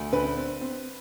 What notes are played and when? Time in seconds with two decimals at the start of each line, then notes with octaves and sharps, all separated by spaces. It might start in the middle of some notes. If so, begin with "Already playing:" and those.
Already playing: D2
0.12 D3 B4
0.36 C4
0.61 C4